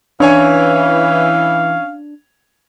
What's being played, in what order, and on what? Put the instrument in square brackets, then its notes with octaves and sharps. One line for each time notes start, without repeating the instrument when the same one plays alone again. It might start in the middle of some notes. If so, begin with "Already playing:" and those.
[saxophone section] E3 [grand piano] C#4 C#5 G#5 [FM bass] D4 [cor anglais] F5